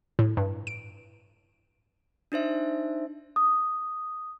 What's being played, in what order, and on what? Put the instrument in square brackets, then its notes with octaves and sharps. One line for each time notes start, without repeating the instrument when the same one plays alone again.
[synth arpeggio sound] A2
G2
D7
[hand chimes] D4 D#4 C5 E5
[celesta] D#6